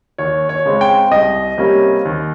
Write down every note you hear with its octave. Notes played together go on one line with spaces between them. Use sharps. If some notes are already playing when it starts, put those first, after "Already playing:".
D#2 C#5
C#5
C#3 G#3 C4
G5
C2 D#5
C3 G3 A#3 C#4
D#2